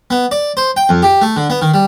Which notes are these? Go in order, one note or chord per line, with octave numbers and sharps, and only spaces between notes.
B3
D5
C5
G5
F2
G4
A3
D3
B3
D#3
G3